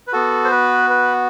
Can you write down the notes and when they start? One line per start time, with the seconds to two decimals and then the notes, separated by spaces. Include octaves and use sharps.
0.07 B4
0.13 B3 F#4 A4
0.44 C5
0.51 B4
0.90 B4